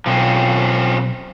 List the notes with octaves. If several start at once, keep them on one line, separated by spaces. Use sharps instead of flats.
B1 F3 C4 C#4